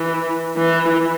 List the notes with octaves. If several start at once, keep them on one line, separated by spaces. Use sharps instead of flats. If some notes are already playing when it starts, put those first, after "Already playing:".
Already playing: E3
E3